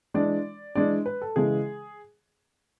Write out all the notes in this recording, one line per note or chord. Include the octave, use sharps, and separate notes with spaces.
E3 G#3 D4 D5
E3 G#3 D4 D5
B4
A4
C#3 E3 G#3 G#4